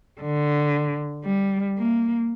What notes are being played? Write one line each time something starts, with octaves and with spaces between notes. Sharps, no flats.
D3
G3
A#3